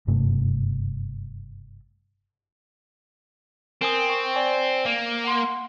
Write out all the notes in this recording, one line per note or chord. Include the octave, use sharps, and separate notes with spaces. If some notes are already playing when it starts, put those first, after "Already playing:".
F#1 G2 C3 A3
C4 A#4 G#5 D#6
G5 C#6
D5 G#5 D6
A#3
F#5 C6